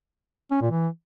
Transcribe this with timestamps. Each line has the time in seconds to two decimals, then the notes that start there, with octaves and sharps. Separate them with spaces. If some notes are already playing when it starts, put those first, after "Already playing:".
0.51 C#4
0.61 A#2
0.71 E3